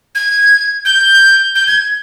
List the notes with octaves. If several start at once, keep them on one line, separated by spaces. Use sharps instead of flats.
G#6
G6
G6
G#6